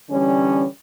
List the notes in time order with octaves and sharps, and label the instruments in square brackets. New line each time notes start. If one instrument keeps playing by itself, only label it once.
[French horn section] D3 E3 G3 C#4